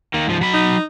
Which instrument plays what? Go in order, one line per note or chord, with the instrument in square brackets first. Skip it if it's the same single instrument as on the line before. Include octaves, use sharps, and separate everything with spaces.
[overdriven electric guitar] D#3 A#3
G#2 F3
F#3 B5
[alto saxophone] D#4